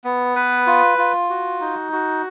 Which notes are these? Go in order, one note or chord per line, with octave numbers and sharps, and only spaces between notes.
B3
B4
F4
F4
F#4
D#4
F#4